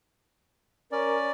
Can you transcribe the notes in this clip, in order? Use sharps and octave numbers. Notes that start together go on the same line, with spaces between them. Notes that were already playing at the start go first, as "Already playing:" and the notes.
C#4 A#4 D5